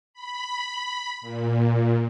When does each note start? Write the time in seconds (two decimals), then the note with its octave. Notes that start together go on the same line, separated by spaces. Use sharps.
0.14 B5
1.21 A#2